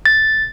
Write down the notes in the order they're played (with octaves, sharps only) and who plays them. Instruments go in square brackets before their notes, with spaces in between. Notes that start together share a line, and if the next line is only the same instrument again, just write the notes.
[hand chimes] A6